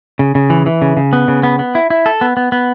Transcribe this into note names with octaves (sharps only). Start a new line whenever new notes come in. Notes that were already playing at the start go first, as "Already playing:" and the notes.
C#3
C#3
E3
E3
C#3
C#3
B3
C#3
B3
B3
E4
E4
A4
B3
B3
B3